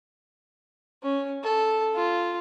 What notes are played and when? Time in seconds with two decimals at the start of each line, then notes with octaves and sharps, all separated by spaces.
1.03 C#4
1.44 A4
1.95 F4